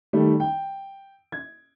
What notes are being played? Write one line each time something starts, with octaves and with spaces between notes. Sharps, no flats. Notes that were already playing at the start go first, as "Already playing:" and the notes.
D#3 G3 A3
G5
G#6